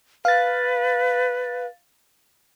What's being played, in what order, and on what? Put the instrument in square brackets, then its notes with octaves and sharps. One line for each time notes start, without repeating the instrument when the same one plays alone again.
[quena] B4 [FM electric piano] F5 A6